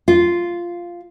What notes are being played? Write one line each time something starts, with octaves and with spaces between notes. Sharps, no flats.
F4